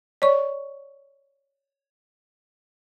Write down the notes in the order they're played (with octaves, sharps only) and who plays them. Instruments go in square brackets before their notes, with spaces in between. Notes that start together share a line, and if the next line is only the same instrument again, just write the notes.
[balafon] C#5 D5 C#6